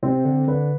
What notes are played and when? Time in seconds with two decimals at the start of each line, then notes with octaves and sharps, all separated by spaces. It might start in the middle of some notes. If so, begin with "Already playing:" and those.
0.03 C3 C4
0.25 D3
0.48 D3 B4